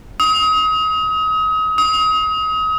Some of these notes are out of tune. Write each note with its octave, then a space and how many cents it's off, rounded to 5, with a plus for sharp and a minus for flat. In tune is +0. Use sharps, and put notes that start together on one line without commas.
D#6 +35
D#6 +35